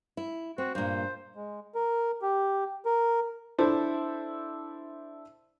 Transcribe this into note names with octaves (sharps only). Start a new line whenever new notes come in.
E4
C4 F#4
G2 A#2 C5
G#3
A#4
G4
A#4
D4 E4 A4 C5 E5 A5